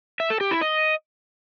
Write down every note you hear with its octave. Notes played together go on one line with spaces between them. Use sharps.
E5
A4
G4
E4
D#5